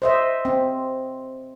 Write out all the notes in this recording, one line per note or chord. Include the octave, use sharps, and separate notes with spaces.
C5 D#5 E5
C4